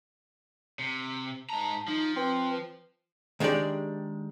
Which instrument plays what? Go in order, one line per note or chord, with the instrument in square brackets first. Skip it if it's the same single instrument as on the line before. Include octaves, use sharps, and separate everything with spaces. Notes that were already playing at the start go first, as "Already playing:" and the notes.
[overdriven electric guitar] C3
[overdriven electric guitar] G#2 A#5 [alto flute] A5
[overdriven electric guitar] F3 [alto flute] D#4
[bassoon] C4 [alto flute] B4
[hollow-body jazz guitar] D#3 G#3 D4 G4 D5